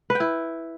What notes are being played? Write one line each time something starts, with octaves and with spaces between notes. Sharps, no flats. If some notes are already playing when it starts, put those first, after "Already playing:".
B4
G5
E4